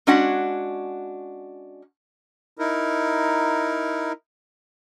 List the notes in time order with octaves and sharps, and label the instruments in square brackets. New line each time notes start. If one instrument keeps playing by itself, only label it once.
[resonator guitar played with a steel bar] G#3 C#4 D4 F#4 F#5
[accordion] D#4 E4 A#4